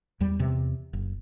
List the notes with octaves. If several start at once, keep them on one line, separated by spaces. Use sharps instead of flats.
E2 G3
E2 C3
F#1